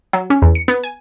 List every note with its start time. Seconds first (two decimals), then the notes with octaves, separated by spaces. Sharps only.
0.13 F#3
0.30 C#4
0.42 E2
0.55 C#7
0.68 B3
0.84 G#5